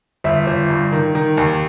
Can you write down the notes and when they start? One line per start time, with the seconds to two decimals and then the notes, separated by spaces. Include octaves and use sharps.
0.24 G1 E5
0.47 G1
0.70 G2
0.92 D#3
1.15 D#3
1.37 D#2